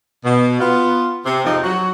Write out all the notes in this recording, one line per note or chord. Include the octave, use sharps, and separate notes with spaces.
B2
B3 F4
C3
F2 G#2 C3 F3 C4 D#4
F#3 F#4